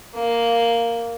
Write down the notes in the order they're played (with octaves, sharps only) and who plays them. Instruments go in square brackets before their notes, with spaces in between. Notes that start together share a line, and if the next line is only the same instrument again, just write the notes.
[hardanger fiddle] A#3